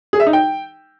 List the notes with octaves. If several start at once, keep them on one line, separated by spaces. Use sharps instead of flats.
G#4
E5
D#4
G5